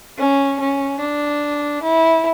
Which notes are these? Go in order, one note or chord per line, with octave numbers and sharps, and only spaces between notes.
C#4
C#4
D4
E4